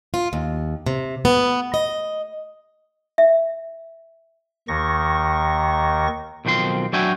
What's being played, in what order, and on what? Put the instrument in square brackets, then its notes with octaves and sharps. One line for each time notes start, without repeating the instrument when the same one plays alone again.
[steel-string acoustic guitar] F4
D#2
C3
B3
D#5
[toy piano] E5
[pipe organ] D#2 D#3 C#6 A#6
[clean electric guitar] B1 D#3 F3 C4 C6
F#3 D4 F#4 E5 G5 G#5